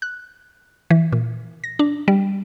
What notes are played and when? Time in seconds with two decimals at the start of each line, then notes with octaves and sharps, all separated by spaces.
0.02 F#6
0.90 E3
1.12 A#2
1.64 A#6
1.79 D4
2.08 G3